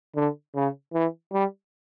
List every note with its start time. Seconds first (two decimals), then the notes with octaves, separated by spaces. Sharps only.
0.16 D3
0.55 C#3
0.93 E3
1.32 G3